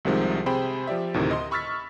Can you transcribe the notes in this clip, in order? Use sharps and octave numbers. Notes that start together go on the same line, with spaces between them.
C2 C3 D#3 F3 G#3
C3 G#4 C5 G5 B5
F3 G4 D5 E5
D2 A2 C3 D#3
D#5 C6
B5 C#6 E6 F6 A6 B6